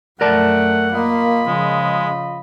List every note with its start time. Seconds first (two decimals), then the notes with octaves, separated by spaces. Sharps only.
0.21 F#2 A3 A#4 D5 F#5 A5
0.93 A#3 F4 D#5 B5
1.47 C#3 F3 G#3